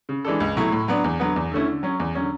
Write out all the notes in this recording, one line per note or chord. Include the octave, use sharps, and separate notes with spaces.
C#3
E3 G#3 D4 A4
C#2
B2 F#3 A3 E4
A2
F#3 B3 D4
E2
D3 F#3 B3
E2
D3 A3 C#4 E4
D3
F#3 C#4
E2
D3 F#3 C#4